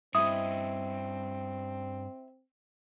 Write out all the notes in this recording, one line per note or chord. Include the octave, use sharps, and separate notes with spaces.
G2 C4 C#4 E4 D#5 D#6